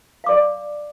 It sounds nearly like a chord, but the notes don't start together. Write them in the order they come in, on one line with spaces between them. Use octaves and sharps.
F5 D6 D5